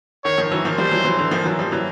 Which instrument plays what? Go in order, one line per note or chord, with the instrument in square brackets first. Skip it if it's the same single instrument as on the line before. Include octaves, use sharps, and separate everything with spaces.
[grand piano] D#3 [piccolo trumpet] C#5
[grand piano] D#3 F3
E3 F#3
D#3 F3
[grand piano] F3 G3 [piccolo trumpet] C5
[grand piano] E3 F#3
E3 F#3
D3 E3
D#3 F3
E3 F#3
F3 G3
E3 F#3